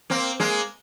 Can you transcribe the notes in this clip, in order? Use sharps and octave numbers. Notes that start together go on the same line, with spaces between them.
A#3 C4
G#3 A#3